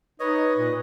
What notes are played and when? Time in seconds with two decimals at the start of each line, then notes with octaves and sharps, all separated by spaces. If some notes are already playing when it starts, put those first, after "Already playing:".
0.20 D#4 B4 C#5 D#5
0.57 A#2 D#5